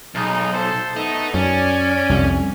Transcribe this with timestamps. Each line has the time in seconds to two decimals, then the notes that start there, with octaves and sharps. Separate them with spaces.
0.15 B1 G#3 D#4
0.53 A4 C5
0.96 A3 B3 D#4
1.34 F#2 C#4 D5 G#5
2.09 C2 F2 C3